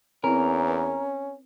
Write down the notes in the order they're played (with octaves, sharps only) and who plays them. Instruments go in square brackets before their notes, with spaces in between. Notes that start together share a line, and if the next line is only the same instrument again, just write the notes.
[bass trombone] E2 [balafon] C4 E4 [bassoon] C#4 [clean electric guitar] A#4
[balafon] B4